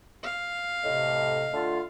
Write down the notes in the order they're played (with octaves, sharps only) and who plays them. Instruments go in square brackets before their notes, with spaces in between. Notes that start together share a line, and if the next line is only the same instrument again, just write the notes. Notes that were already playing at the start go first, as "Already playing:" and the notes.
[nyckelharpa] F5
[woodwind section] A2 C3 [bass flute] D#5
[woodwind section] D3 A3 F4